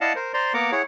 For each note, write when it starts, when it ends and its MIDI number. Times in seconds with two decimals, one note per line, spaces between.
0.01 0.13 64
0.01 0.13 74
0.01 0.13 75
0.01 0.13 77
0.01 0.13 78
0.01 0.13 81
0.16 0.33 70
0.16 0.33 72
0.34 0.53 72
0.34 0.53 74
0.34 0.53 82
0.34 0.53 84
0.54 0.72 58
0.54 0.72 59
0.54 0.72 70
0.54 0.72 78
0.54 0.72 82
0.54 0.72 86
0.72 0.82 64
0.72 0.82 68
0.72 0.82 73
0.72 0.82 78